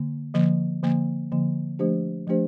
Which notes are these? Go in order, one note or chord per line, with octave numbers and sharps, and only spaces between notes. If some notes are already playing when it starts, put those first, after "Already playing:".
Already playing: D3 A#3
D3 F3 A#3
D3 F3 A#3
D3 F3 A#3
F3 A3 D4 G4 C5
F3 A3 D4 G4 C5